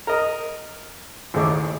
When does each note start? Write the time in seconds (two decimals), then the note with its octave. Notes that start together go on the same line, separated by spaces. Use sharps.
0.07 A#4 D#5
1.34 A1 D#2 C#3 A4 D6